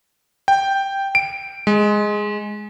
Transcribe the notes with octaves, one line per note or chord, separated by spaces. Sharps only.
G5
D7
G#3